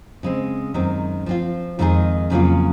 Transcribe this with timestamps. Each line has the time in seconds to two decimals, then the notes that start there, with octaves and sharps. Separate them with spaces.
0.23 C#3 G#3 C4
0.74 F#2 D#3 G#3 C4
1.26 F3 C4 F4
1.79 F2 D#3 G#3 D#4 G#4
2.30 F2 C#3 F#3 A#3 F4